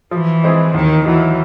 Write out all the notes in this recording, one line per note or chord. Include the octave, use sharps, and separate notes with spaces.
E3 F3
G#3 C4 E4 G#4
D#2 D#3
D#3 E3 F#3